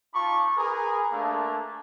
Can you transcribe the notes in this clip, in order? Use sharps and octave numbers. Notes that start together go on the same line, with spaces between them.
D#4 F4 A5 B5 C#6 D6
G#4 A#4 B4
A3 A#3 D4